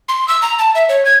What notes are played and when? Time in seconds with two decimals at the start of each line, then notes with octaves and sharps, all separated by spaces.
0.09 C6
0.28 E6
0.42 A#5
0.59 A5
0.75 E5
0.89 C#5
1.05 G#6